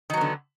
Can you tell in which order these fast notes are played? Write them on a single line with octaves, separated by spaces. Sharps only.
D#3 F#3 B3 D3